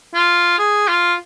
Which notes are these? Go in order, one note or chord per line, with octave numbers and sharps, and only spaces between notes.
F4
G#4
F4